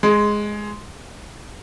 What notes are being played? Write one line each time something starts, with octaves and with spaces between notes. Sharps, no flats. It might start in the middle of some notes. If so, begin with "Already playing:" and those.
G#3